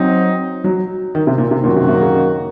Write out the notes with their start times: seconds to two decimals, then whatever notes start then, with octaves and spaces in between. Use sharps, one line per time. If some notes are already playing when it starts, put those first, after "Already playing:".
Already playing: F#3 C4 D#4
0.64 F#3
1.15 D#3
1.27 C3
1.38 A#2
1.51 C3
1.63 F#2 A#2 D#3 A#3 C#4 F#4
1.76 C3
1.88 C3
2.01 C#3